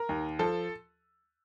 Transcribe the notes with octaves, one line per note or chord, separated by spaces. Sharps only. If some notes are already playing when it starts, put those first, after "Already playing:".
Already playing: A#4
D#2
F3 A4